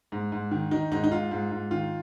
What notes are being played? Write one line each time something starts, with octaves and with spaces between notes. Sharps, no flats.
G#2
G#2
D#3
D#3 D#4
G#2 D#4
D#4
G#2 F4
G#2
G#2
D#3 F4